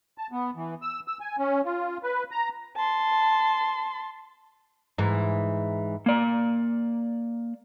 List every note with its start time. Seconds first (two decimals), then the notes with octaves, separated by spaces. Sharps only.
0.18 A5
0.32 B3
0.56 E3
0.82 E6
1.08 E6
1.20 G#5
1.39 C#4
1.65 F4
2.03 B4
2.31 A#5
2.76 A5 C6
4.98 G#2 E3
6.06 A#3 D5